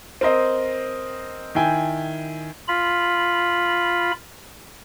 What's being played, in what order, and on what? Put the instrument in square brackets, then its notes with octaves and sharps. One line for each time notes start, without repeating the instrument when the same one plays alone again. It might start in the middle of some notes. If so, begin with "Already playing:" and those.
[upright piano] C4 A#4 C5 D#5
D#3 E4 G5 G#5
[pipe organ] F4 B5